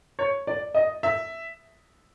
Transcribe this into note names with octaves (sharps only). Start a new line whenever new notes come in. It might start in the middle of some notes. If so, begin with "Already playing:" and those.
C#5
D5
D#5
E5